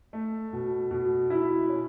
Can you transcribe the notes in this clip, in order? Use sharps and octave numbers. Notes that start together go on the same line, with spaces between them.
A3
B2
B2
E4
C#4